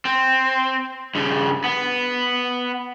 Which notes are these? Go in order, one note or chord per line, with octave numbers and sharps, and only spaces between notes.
C4
G2 C#3
B3